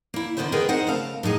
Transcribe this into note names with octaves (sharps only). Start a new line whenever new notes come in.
A#3 E4
D3 D#3 B3 C4 C5 E5
B3 G#4 A#4 B4 D#5 G5
C4 D#4 C5 F#5
C#3 A3 A#4 F5 A5
A2 F#3 D#4 G#4